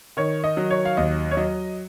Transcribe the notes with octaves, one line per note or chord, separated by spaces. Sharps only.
D#3 C#5
D#5
F#3
C#5
F5
D#2 D#5
C#5
F#3 D#5